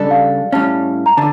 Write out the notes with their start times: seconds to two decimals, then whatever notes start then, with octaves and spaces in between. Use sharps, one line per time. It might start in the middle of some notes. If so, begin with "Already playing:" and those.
Already playing: C#3 G3 D4 A4 D5
0.11 F5
0.52 A2 G3 C#4 A5
1.06 A#5
1.17 D3 A5